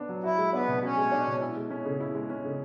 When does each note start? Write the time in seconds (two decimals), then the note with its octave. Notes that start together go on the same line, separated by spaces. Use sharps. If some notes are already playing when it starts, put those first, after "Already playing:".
Already playing: B3 D4
0.09 F#3
0.23 E4 F#4
0.38 G#3
0.53 B3 D4
0.68 B2
0.83 C#4 F#4
0.97 G#3
1.12 D4
1.27 B2
1.42 E4
1.56 G#3
1.70 C#4
1.85 C#3
2.00 E4
2.15 G#3
2.30 C#4
2.44 C#3